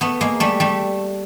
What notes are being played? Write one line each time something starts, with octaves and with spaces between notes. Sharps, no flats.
A3 B3
G#3 A#3
G3 A3
G3 A3